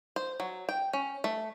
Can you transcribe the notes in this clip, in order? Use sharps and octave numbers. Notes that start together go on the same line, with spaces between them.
C5
F#3
G5
C#4
A3